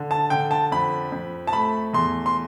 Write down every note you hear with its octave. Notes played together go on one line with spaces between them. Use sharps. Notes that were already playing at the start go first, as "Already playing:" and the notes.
Already playing: D3
A5
D3 G5
A5
F2 B5
F2
A5
A3 B5
E2 C6
C6